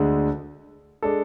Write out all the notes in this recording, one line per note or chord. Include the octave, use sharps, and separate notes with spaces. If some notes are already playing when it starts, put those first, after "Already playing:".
Already playing: D2 D3 G#3
G#3 D4 A4